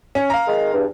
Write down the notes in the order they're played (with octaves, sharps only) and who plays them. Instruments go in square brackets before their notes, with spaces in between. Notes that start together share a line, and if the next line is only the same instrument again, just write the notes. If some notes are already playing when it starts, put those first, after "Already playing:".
[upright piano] C#4
F5 A#5
[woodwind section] D#3 G#3
E2 G2